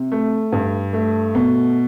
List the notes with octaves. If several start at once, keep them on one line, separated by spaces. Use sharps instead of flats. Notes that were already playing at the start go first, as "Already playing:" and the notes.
Already playing: C3
A3
G2
A3
B2